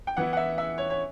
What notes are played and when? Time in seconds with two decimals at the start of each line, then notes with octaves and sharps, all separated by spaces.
0.07 G5
0.17 E3 B3 E4 F#5
0.33 F#5
0.37 E5
0.58 E5
0.78 C#5
0.90 C#5